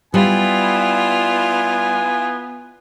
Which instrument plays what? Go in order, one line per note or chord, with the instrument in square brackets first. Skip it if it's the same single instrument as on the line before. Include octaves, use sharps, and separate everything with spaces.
[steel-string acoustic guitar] G3 [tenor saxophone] B3 [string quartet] E4 F4 [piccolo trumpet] G#5